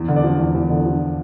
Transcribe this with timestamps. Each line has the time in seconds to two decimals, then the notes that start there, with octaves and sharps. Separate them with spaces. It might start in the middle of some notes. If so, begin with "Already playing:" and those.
Already playing: E2
0.08 D3
0.16 D5
0.24 F3
0.39 E2
0.55 E2
0.70 D3
0.86 F3